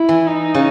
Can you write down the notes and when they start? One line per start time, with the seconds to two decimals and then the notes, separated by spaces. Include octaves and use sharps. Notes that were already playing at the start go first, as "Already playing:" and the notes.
Already playing: E4
0.09 E3
0.27 D#4
0.55 C#3